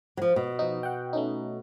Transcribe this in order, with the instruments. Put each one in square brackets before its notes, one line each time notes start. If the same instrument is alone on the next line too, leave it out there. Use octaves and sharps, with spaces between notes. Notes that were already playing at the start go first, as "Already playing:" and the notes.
[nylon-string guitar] F3 F#3
B2
[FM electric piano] F3 D#4
F#5 G5
A3 C#4 D#4